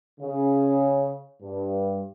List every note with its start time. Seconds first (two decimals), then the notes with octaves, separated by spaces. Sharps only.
0.20 C#3
1.41 G2